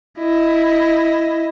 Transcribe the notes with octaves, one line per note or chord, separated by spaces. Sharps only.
E4 D#5